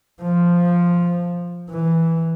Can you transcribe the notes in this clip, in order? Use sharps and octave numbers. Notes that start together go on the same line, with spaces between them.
F3
E3